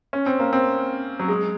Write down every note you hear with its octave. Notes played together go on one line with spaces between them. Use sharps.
C#4
C4
A#3
C4
F#3
G#3